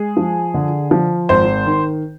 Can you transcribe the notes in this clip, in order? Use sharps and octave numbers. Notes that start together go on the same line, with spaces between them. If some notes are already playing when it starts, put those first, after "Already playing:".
Already playing: G#3 G#4
F3
D3
F3
G#1 C5
D#3